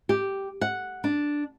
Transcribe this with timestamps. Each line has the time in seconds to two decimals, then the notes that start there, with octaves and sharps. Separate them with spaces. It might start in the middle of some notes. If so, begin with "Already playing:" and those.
0.09 G4
0.61 F#5
1.04 D4